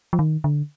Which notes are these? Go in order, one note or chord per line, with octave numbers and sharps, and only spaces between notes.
F3
D#3
D3